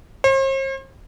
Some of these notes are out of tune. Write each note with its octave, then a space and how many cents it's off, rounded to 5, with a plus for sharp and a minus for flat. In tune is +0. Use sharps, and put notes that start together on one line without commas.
C5 +45